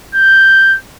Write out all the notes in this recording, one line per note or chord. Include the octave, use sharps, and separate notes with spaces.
G6